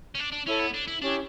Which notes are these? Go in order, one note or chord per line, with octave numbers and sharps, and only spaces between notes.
C#4
D4
D4
C#4 E4 A4 C#5
B3
D4
E4
C#4 D4 E4 G4 C#5